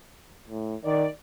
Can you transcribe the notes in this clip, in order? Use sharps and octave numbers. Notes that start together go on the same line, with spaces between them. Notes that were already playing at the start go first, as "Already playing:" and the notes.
A2
D#3 D5